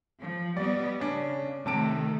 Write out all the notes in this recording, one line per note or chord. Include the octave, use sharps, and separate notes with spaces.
F3
G3 B3 D5 D#5
C#3 C#4 D4
C3 D#3 A3 A5 D7